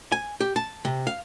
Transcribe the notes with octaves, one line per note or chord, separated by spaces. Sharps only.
G#5
G4
A5
C3
F5